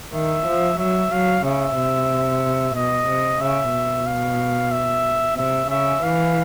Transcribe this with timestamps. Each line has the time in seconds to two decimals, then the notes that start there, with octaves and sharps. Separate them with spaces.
0.13 D#3 E5
0.47 F3
0.79 F#3 E5
1.12 F#3 F5
1.44 C#3 E5
1.77 C3
2.75 B2 D#5
3.08 C3
3.41 C#3 E5
3.73 B2
4.06 F5
4.71 E5
5.37 C3 E5
5.70 C#3 E5
6.03 E3 F5